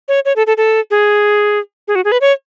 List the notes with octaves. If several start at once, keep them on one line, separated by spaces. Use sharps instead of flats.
C#5
C#5
A4
A4
A4
G#4
G#4
F#4
G#4
B4
C#5